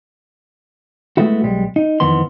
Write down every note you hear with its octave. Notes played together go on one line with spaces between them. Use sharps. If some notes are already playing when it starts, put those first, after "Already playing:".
G#3 A3 B3 E4 F#4
B1 G3 G#3
D#4
F2 D#3 E3 B3 C6